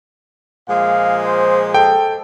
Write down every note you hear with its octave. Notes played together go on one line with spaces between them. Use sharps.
A#2 F3 G#3 F5
C5
A4 G5